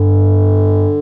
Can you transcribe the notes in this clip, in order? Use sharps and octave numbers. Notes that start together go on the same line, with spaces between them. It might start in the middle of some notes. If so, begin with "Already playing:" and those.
Already playing: G2 D3